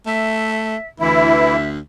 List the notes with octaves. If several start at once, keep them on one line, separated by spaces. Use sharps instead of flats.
A3 E5
D2 E3 E4 E5